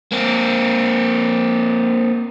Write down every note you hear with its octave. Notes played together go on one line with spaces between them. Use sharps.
A#3 C4